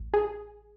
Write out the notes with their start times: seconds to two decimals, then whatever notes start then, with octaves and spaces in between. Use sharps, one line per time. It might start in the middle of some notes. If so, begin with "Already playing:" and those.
Already playing: A1
0.14 G#4